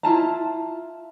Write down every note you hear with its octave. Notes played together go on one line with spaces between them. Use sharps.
E4 F4 A5 A#5